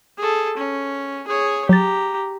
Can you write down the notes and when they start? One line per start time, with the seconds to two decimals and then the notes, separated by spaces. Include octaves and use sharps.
0.18 G#4 A4
0.57 C#4
1.28 G#4 C#5
1.69 F#3 G4 A#5 A6